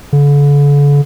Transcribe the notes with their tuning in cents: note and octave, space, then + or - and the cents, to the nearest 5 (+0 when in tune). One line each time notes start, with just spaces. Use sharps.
D3 -40